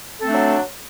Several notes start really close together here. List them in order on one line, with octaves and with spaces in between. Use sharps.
A4 C4 A3 D4 F#3